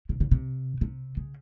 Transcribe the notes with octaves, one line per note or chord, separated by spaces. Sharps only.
C3
C#3
C3
C3
C#3